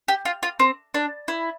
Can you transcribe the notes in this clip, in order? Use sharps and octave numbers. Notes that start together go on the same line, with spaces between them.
G4
F4
F4
C4
D4
E4